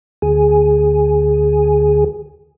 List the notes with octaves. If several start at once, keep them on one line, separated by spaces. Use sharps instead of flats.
D2 G#4